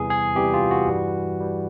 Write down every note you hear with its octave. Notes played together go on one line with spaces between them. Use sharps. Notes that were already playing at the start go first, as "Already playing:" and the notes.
Already playing: E2 C3 E3 G3 G#4
G#4
E2 C3 E3 G3 G4
F4
F#4
G2 E3 G3
E3 G3